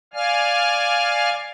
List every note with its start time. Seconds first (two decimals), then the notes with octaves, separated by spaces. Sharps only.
0.14 D5 F5 G#5 F6